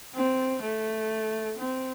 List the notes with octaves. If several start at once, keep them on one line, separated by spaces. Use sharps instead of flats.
C4
A3
C4